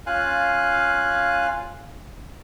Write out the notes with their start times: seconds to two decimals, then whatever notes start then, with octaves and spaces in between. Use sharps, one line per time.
0.07 C#4 F4 F5 G#5 F#6